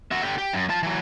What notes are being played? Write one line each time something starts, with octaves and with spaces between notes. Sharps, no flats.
F#4 E5
D3 G4
G4
F#2
F4 A5
E3 F#3